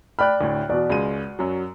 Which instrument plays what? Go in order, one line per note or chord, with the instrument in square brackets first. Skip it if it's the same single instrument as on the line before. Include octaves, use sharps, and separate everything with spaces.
[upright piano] D5 G5 F6 [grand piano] B5 F#6
[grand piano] D2 A2
[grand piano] E2 B2 [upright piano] F#4 D5
[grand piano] C#2 G#3 D#7
F#2 F#3